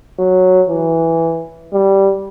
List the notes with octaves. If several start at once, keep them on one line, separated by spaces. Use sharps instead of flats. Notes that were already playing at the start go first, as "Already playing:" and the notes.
F#3
E3
G3